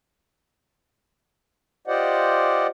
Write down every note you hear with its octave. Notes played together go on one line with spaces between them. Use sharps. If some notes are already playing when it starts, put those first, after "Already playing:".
F4 G4 C5 D5 D#5 F#5